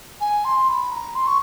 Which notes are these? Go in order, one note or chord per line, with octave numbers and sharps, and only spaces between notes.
G#5
C6
B5
A#5
C6
C#6